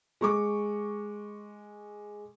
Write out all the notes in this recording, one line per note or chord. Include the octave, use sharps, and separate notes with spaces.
G#3 C#6 D6